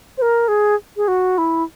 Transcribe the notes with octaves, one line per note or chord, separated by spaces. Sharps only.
C5
A#4
G#4
G#4
F#4
E4